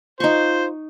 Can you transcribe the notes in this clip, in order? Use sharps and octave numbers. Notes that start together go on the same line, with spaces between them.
D#4 F4 C5 C#6